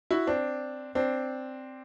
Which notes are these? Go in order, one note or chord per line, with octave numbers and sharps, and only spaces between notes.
E4 F#4
C4 D4
C4 D4